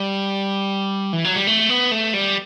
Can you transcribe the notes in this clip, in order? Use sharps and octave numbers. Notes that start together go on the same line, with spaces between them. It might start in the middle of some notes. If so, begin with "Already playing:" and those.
Already playing: G3
E3
F#3
G3
A3
B3
A3
G3